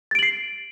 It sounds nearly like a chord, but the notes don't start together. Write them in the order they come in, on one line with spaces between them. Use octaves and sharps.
A6 D7 F#7 C7